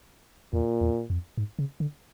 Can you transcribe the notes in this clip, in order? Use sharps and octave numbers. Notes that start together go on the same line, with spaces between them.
E2 A#2
E2
F2
G#2
C#3
D3